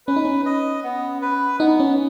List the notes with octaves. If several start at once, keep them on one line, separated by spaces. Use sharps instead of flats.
C#4 B4
D#4
C#4
D#5
B3
B4
B3 D#4
C#4